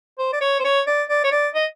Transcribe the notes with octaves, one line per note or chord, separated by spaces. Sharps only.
C5
D5
C#5
C5
C#5
D5
D5
C#5
D5
D#5